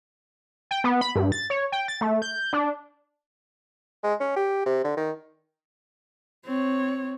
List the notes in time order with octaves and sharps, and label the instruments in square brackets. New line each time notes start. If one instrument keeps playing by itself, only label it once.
[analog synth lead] G5
B3
B5
G2
A6
C#5
G5
A6
A3
G6
D4
[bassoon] G#3
C#4
G4
C3
D3
D#3
[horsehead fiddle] C4 C#5